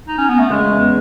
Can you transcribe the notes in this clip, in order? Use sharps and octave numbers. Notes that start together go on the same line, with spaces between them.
D#4
C#4
B3
A3
C#3 G#3
E2